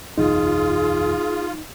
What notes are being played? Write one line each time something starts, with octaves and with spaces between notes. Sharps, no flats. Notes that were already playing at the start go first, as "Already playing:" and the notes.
F#1 B1 E2 D#4 F4 G#4